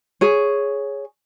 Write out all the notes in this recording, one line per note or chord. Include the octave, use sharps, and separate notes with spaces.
G#4 C#5